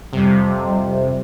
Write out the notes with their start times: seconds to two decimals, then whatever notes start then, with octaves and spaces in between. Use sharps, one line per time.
0.13 F2 C3 G3